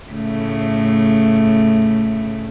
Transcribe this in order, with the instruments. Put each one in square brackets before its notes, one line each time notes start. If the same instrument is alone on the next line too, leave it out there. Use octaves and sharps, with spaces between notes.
[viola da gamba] A2 C#3 A3